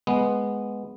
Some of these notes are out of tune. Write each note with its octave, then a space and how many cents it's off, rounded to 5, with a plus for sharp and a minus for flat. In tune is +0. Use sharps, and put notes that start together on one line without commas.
G#3 +0 B3 +0